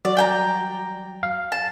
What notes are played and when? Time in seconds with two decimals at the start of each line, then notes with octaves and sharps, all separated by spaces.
0.05 F#3 F#4 D5
0.17 G5 G#5 A#5
1.23 F5
1.52 A5